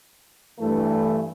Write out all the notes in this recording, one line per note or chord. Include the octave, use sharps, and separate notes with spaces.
G2 E3 A3